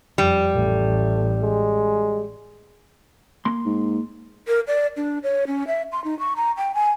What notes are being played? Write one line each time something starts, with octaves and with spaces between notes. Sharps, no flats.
F2 G3
A1 A3
G#3
A#3 C6
G#2
A#4
D5
D4
C#5
C#4
E5
C6
D#4
C#6
A#5
G5
G#5